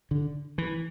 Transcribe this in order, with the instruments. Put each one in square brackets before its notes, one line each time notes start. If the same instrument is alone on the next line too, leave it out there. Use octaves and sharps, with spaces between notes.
[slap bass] D3
E3